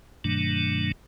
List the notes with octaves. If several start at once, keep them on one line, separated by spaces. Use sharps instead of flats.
G2 B2 D#3 F#3 A3 D4